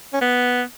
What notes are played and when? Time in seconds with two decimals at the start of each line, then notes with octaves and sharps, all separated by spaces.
0.13 C#4
0.21 B3